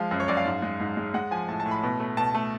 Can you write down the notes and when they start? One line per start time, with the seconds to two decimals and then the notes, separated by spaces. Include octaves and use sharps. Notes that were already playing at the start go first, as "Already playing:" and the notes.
Already playing: F3 G#3 F5
0.11 F#2
0.20 C#5
0.28 F#2 D5
0.37 F5
0.45 G#2
0.62 G#3
0.80 G#2
0.97 G#3
1.14 G#3 F#5
1.31 F3 G#5
1.48 A2 A5
1.60 A5
1.65 A2
1.71 B5
1.83 B2
2.00 A3
2.17 B2 A5
2.35 A3